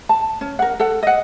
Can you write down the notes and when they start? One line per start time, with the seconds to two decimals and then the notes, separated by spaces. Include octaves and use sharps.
0.09 A5
0.41 C#4
0.59 A#4 F#5
0.80 A4 F#5
1.03 D#5 F#5